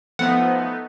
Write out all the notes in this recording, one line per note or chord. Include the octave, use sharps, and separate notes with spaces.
F3 A3 B3 D#4 F#5